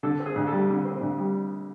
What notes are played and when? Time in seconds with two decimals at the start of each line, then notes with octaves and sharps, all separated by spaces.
0.03 D3 A4
0.20 C4
0.26 G#4
0.36 D2
0.47 A4
0.52 G3
0.69 D3
0.85 C4
1.01 D2
1.18 G3